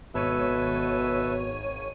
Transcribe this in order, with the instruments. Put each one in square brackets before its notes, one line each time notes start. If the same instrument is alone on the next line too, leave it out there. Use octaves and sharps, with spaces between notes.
[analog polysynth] G#1 C#5 D#7 [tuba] B2 [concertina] A4 B4 E5